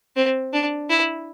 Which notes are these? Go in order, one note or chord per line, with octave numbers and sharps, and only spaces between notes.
C4
D4
E4